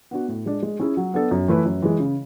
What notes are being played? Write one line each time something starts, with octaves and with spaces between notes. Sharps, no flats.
B3 D4 F#4
A2
G#3 D4
G#3
C#4 E4 G#4
F#3
B3 D4 A4
F#2
E3 A3 E4 B4
F#2
E3 G#3
C#3